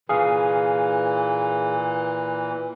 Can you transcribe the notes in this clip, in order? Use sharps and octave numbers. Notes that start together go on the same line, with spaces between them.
A#2 E3 G#4 F5